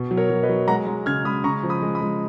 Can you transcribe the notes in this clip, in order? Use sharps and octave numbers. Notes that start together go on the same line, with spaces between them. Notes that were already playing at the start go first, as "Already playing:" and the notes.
Already playing: B2
F#3
A#4 C#5
F#3
B4 D#5
F#3
G#3 F#5 A#5
G#3
C#3 F6 G#6
G#3 B5 D#6
C#3 A#5 C#6
F3
B5 D#6
G#3
B5 D#6
G#3